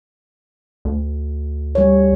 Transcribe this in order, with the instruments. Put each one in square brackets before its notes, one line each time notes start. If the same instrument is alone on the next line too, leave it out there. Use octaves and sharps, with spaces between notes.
[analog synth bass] D2
[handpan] G3 C#5